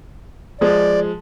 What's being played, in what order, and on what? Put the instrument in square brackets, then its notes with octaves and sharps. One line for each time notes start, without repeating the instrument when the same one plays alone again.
[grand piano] F3 G#3 [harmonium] D5